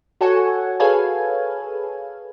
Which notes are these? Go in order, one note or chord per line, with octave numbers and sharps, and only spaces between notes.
F#4 A4 C#5 F#5 G#5 C#6
G#4 A4 B4 C#5 F5 G#5